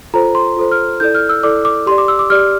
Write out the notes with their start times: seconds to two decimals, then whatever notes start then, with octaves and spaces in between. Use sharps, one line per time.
0.14 F4 A4 C5 A#5
0.35 C6
0.57 F4 A4 C5
0.71 F6
1.00 E4 A4 D5 G6
1.15 F6
1.29 E6
1.43 E4 A4 D5 D6
1.65 D6
1.86 G4 C6
1.91 D5
1.98 D6
2.08 E6
2.19 D6
2.30 G4 D5 F6